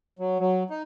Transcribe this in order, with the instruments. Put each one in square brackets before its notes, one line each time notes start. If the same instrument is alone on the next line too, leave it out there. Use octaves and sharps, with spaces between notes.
[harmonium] F#3
F#3
D#4